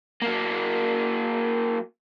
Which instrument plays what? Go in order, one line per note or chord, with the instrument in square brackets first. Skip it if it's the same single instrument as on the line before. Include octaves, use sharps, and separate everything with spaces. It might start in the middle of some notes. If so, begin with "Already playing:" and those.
[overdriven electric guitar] F#3 A#3